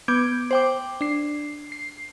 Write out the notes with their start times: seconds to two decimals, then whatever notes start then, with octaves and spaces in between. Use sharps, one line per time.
0.08 B3 D6 G6 G#6 D7
0.51 C5 G5 D6
1.01 D4 C7
1.72 C7